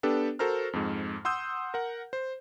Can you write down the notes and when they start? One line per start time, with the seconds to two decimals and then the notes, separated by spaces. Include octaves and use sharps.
0.03 B3 D4 G4 A4 B4
0.39 F#4 A4 A#4 C5 A#5 F6
0.73 F2 G#2
1.25 F#5 C6 D#6 E6 G6
1.74 A#4 F#5
2.13 C5